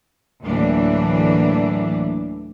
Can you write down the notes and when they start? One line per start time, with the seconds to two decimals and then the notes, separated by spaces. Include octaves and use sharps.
0.43 D2 A2 E3 F#3 A#3 D4